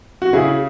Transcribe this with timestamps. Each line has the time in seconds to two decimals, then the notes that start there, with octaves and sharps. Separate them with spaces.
0.22 F#4
0.33 C#3 E4 G#4